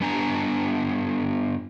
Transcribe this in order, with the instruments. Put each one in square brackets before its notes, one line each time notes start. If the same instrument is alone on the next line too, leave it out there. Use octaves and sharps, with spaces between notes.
[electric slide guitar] G2 B3 D4 G#5 A#5